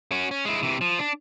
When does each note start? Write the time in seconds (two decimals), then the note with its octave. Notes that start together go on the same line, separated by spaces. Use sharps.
0.12 C#4 F#4
0.31 C#4
0.45 G#3 E4
0.63 C3 E3
0.81 F3
0.99 D4